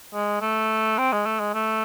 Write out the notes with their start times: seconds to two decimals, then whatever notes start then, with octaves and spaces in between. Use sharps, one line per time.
0.14 G#3
0.41 A3
0.98 C4
1.12 G#3
1.26 A3
1.40 G#3
1.54 A3